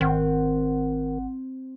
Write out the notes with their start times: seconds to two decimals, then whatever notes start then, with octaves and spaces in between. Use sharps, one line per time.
0.01 G#1 D#3 C4 F#5